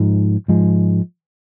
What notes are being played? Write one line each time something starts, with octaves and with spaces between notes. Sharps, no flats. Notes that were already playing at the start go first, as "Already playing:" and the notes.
Already playing: G#2 F3 G#3
G#2 F3 G#3